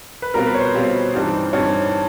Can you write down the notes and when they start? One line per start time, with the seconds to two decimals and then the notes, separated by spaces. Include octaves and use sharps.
0.22 B4
0.34 B2 G3 C4 F4 A#4
0.47 B4
0.54 C#5
0.60 C5
0.74 B2 G3 C4 F4
1.14 G2 E3 G3 C4 D#4
1.53 G2 E3 G3 C4 D#4 C#5